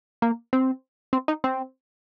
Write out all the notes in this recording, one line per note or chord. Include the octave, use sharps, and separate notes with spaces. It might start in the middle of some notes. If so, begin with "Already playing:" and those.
A#3
C4
C4
D#4
C4